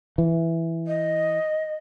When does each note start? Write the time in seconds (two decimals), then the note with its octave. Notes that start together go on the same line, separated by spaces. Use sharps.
0.18 E3
0.87 D#5